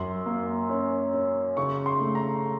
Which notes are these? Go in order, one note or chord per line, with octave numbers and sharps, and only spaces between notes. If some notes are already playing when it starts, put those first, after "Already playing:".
Already playing: F#2 C6
A#3
C#4
C#4
C#3 C#6
C6
A3
A#5